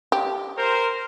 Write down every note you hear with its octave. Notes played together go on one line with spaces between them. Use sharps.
G4
A#4 C5